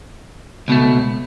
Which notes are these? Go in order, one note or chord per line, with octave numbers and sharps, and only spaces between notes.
C#2 B2 A3